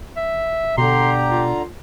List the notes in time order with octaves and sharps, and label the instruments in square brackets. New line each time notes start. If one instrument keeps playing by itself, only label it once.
[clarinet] E5
[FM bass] B2 [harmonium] D3 A#5 [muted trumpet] G4 [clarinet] C6
[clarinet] F4